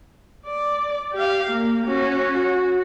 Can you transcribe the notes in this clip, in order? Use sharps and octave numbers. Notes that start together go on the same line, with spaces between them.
D5
G4 F5
A#3
C#4 F#4
F#4